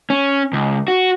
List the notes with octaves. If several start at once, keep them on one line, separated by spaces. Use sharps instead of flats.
C#4
C#2
F#4